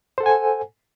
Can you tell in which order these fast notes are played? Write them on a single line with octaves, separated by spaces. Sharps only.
C5 A4 F#5 G#5